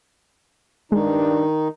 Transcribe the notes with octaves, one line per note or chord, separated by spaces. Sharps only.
G2 D#3 G#3 D4 D#4